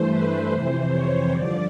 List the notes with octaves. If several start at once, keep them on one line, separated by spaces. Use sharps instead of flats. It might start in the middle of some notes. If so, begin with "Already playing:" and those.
Already playing: G2 E3 A3 C5
B4
F2 C3 E3 C5
C#5
G2 D3 F3 D5